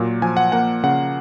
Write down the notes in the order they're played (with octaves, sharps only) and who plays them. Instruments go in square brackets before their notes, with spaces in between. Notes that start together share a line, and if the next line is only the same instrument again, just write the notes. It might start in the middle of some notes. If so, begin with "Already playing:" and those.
Already playing: [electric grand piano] A#2 F#3
F3 G#5
F#5
A#3 F#5
C#3 F#5